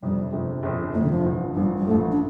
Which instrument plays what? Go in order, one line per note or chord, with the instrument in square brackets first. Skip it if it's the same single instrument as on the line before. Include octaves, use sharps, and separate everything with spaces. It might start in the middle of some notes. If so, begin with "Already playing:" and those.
[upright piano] G1 F2 C3 [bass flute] G3
[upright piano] G1 F2 C3
G1 F2 C3
[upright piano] G1 F2 C3 [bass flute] A3
[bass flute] D3
F3
[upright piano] A1 G2 F3
[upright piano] A1 G2 F3 [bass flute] G3
[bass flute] G3
[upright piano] A1 G2 F3 [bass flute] A3
[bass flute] D4